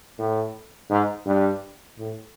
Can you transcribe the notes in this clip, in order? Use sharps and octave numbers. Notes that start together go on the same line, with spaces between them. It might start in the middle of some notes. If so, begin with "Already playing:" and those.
A2
G#2
G2
A2